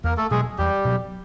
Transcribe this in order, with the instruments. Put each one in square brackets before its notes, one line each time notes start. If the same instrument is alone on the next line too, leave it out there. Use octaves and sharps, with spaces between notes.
[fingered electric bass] E2 [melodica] A#3 A#4
[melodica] A3 A4
[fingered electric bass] B2 F#3 [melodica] G#3 G#4
[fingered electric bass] E2 [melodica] G3 G4
[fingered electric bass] B2 F#3